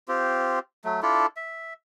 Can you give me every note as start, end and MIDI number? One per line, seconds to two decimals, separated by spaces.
0.08 0.59 60
0.08 0.59 65
0.08 0.59 67
0.85 1.00 54
0.85 1.00 57
1.02 1.26 62
1.02 1.26 64
1.02 1.26 65
1.02 1.26 69
1.37 1.74 76